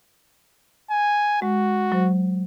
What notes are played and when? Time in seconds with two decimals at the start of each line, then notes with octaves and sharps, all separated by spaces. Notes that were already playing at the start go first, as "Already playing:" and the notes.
0.90 G#5
1.42 G#3 F#4
1.92 F#3 C5